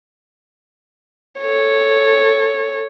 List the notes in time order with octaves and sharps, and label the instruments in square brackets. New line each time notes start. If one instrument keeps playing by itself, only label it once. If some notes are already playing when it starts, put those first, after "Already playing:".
[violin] A4 C#5